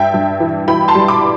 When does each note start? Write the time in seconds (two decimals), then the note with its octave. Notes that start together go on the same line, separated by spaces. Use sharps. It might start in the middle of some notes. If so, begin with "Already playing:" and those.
Already playing: G2 E5 G5
0.14 G2
0.40 E3
0.68 E3 G5 B5
0.88 A5 C6
0.95 G3
1.08 B5 D6